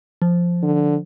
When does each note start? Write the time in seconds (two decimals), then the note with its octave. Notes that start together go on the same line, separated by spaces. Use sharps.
0.22 F3
0.62 D3